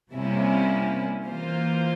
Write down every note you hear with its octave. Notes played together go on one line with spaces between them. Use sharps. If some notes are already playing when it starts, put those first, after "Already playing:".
C3 G3 A#3 C#4 E4
E3 A#3 F4 C5